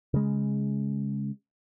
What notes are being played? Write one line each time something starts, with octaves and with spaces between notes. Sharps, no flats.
C#3 G#3